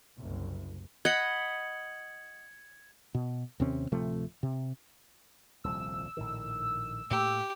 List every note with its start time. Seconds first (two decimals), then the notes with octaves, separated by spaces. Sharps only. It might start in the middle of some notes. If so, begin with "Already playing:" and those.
0.17 F#1 C2
1.05 D#5 F#5 B5 G#6 C#7 F#7
3.15 B2
3.60 D#2 C3 C4 C#4
3.92 D1 C3 F3 A3
4.43 C3
5.64 D#1 C2 F3 E6
6.17 A#1 A2 D#3
7.10 A2 A3 A#3 G4